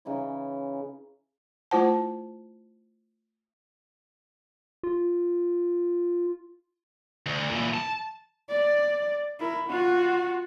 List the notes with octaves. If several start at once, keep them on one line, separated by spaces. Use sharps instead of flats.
C#3 E3 D#4 E4
A3 E4 F4 C5 F#5 A5
F4
D2
A#2 E3
A5
D5
E4 A#4
F4 F#4